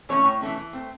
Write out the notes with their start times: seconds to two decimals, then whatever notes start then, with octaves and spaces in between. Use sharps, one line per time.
0.09 E3 A3 C#4 C#5
0.25 A2
0.41 E3 A3 C#4
0.57 E3
0.73 A3 C4